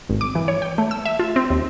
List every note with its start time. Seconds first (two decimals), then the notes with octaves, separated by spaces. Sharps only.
0.09 G#1
0.21 D6
0.35 E3
0.48 C#5
0.62 G5
0.78 A3
0.91 E6
1.05 E5
1.19 F4
1.36 C4
1.50 D#2